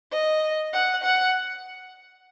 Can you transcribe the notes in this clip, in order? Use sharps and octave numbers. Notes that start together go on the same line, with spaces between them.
D#5
F#5
F#5